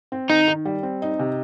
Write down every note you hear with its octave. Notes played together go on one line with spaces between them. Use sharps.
C4
D#3 D#4
D#3
G3
C4
D#4
C3